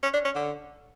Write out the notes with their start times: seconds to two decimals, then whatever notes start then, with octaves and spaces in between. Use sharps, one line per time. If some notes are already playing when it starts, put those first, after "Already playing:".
0.03 C#4
0.14 D4
0.25 C#4
0.36 D3